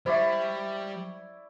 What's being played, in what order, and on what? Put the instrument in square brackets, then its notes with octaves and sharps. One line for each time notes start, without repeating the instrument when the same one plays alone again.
[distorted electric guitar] G3 [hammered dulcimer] E4 D5 C#6 [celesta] C5 E5